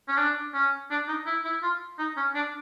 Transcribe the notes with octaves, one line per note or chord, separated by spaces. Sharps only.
C#4
D4
C#4
D4
D#4
E4
E4
F4
D#4
C#4
D4